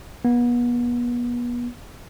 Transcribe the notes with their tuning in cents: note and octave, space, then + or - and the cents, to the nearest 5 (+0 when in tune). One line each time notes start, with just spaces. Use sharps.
B3 -35